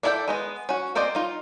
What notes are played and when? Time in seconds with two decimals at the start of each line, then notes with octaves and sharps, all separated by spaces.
0.03 D4 E4 A4 D5 G5
0.28 G#3 B3 D#5
0.69 C#4 F#4
0.95 A#3 C4 C5 D5 D#5
1.15 D#4 F4